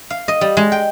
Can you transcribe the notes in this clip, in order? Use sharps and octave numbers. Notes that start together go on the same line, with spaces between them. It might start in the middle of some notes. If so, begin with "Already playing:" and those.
F5
D#5
G3
G#3
G5